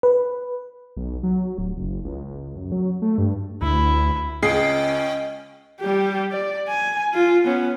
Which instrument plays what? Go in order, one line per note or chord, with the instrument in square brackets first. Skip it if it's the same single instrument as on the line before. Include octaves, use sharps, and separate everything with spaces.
[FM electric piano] B4
[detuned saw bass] B1
F#3
D1
F#1
C#2
F#2
F#3
A3
G2
[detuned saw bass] D2 [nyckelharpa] E4
[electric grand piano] C#2 C7 [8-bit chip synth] C#4 G5 [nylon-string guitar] G#4 [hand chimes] D#5
[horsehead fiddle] G3 G4
D5
G#5
F4
B3 C#4